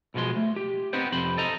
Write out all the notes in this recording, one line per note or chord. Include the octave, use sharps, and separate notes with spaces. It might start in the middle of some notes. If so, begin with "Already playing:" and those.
B1 B2 F3 G#3 C6
A3
G4
B3 C4 D#4 G4 B4 C5
F2 C3 C5 B5
A4 D#5 A#5